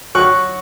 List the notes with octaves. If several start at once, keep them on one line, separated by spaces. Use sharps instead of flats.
F#3 C#6 F#6